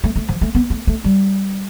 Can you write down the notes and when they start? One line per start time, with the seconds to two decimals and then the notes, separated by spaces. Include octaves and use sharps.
0.04 A3
0.16 A3
0.28 F3
0.41 A3
0.55 B3
0.70 A3
0.87 A3
1.04 G3